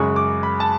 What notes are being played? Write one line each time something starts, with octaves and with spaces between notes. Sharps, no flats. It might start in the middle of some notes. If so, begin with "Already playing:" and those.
Already playing: F#2 C#3 G#3 C#6
D6
B5
A5